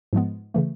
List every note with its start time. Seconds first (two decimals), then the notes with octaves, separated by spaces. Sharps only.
0.13 G#2 F3 G#3 B3
0.54 C#3 E3 A3